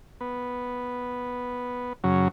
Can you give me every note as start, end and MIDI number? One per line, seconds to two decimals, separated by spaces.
0.21 1.93 59
2.04 2.28 42
2.04 2.28 49
2.04 2.28 54